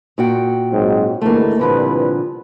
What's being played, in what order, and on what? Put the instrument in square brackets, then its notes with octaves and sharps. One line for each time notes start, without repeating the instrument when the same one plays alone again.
[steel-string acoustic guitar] A#2 F#4 G5
[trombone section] G#2 F#3 C4
[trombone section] D2 G#2 E3 [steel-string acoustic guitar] A3 A#3
[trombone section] C2 B4 [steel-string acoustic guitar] A#2 D3 F3